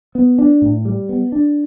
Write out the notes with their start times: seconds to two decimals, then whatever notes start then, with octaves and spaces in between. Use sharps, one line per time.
0.15 B3
0.38 D4
0.62 A2
0.85 G3
1.09 B3
1.32 D4